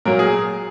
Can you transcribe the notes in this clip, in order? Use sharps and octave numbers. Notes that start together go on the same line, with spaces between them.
A#2 F#3 A#3 A#4
G#4